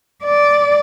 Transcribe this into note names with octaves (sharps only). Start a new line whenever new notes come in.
D5